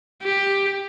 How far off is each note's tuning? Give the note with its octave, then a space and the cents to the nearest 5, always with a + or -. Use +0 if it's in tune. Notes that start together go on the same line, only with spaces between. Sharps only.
G4 +10